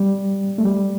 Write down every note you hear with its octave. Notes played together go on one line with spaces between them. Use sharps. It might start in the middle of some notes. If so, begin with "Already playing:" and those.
Already playing: G3
A3
G3